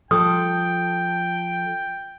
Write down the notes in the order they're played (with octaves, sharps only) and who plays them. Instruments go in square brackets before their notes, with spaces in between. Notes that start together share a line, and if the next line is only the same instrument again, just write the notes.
[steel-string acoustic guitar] F3 A4 [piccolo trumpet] G5 [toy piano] D#6